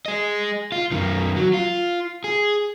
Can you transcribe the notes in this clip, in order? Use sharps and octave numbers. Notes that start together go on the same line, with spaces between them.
G#4 D#5
F4
F#2 D#3
F#3
F4
G#4